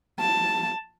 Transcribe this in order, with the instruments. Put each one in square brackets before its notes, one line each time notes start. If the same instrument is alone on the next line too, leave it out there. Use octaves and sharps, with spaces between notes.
[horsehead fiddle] A5